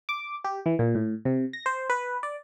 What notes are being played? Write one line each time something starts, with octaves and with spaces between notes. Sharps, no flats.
D6
G4
E3
A#2
A2
C3
A#6
C5
B4
D5